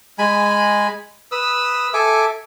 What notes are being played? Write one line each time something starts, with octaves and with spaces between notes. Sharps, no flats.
G#3 G#5 B5
B4 D#6 E6
A4 E5 G#5 D6